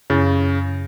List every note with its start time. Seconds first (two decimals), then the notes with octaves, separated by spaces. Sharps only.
0.10 F#2 C#3 A6